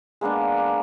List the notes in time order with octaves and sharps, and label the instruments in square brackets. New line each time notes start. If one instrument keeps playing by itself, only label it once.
[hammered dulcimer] G#3 A#3 B3 D4